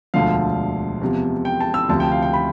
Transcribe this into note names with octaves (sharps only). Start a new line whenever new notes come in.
E1 D2 D3 F3 F5
E2 C3 F3
G5
A5
E6
D2 C3 F3 A5
G5
F5
G5
B5